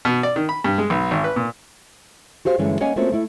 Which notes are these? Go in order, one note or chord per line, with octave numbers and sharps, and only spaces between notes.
B2
D5
D#3
B5
G2
G#3
B1
G#1
B4
A#2
F#4 G4 C5 F5
G2 D3 E3 G#3 A3 C#4
A#3 C#4 C#5 D#5 F#5 G#5
A3 A#3 C4 C#4 F4 F#4
A3 E4